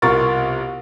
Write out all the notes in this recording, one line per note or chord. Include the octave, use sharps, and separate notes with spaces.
C2 B2 F4 A#4 C#6 A6